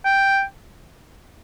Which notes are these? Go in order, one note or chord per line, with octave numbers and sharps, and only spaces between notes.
G5